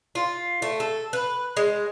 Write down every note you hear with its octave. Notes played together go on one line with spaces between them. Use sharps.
F4
A3
A4
B4
G#3